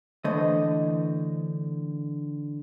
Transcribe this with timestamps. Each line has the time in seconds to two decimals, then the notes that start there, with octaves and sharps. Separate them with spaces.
0.24 D3 E3 A3 C5 D#5